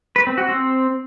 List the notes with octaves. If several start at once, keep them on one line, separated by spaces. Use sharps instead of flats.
B4
C4
F#4
C4